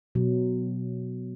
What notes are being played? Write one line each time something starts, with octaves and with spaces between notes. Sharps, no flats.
B2 F#3